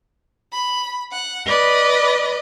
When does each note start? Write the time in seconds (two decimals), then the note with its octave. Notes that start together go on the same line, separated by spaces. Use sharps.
0.52 B5
1.11 F#5
1.46 B4 D5 D#5 B5